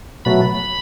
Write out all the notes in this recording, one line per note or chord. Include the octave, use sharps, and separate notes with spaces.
B2 F#3 A3 B5